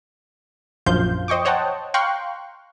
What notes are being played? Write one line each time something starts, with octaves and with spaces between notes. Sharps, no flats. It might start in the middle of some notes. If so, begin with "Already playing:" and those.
A#1 F#2 F3 C5 F5 G6
C5 D#5 G5 C#6 D6
C5 C#5 D#5 F#5 G5 A5
F5 G5 A#5 C6 C#6 F#6